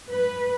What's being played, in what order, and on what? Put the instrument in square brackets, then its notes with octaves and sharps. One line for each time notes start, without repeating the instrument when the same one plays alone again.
[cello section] B4